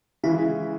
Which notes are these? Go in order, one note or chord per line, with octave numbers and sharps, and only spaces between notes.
C#3 E3 G#3 E4